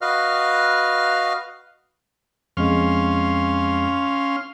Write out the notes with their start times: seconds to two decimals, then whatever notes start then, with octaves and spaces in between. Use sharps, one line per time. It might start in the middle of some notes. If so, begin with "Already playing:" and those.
0.01 F#4 B4 D#5 F5 F6
2.57 F2 G#3 C#4 F5 C6